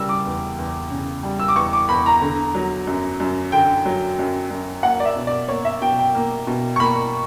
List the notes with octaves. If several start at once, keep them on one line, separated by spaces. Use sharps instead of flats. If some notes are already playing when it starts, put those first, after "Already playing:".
Already playing: C#3 G3 E6
D6
E2
E2
C#3
G3
E6
D6
E2 C#6
D6
E2 B5
A#5
D3
F#3
F#2
F#2
D3 G5
F#3
F#2
F#2
A#3 F#5
D5
E5
B2
D5
A#3 C#5
E5
B2 G5
G5
A#3
B2
C#6
A#3 B5